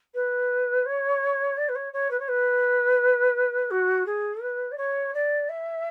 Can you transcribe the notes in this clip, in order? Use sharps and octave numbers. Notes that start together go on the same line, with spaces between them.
B4
C#5
D5
B4
C#5
C#5
B4
C#5
B4
F#4
G#4
B4
D5
C#5
D5
E5